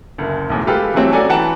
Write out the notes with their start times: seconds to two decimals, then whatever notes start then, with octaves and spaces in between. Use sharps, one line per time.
0.18 F#1 D2
0.50 B1 E2 A2
0.67 G#3 F4 G4 A4 B4 F5
0.94 E3 F#3 G3 A3 C4 C#4
1.13 C#4 F#4 A4 D5 G#5 A#5
1.29 E3 B4 F#5 G5 A5 A#5